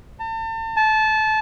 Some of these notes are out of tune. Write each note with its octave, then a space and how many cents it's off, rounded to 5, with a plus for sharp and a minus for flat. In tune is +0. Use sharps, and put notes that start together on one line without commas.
A5 +40
A5 -20